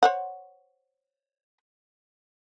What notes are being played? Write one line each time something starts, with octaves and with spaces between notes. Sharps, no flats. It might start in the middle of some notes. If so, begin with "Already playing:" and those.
C5 C#5 F#5